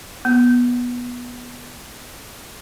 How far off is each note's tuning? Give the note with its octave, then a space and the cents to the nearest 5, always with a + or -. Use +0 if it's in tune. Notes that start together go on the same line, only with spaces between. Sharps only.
B3 -15